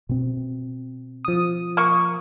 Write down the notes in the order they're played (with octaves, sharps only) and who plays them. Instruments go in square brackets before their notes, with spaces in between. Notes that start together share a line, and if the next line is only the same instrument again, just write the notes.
[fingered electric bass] B2 C4
[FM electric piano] F3 D#6
[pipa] A#3 C#6